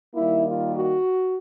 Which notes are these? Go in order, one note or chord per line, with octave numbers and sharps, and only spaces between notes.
D#3 G3 A#3 E4
F4
F#4